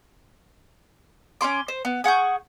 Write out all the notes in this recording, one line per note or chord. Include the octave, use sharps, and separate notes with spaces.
C#4 G#4 C6 D6
C5
B3
G#4 F#5 C#6 G6